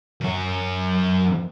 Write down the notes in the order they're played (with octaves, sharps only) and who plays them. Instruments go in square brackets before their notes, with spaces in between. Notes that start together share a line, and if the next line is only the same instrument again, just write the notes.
[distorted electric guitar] F#2 C#5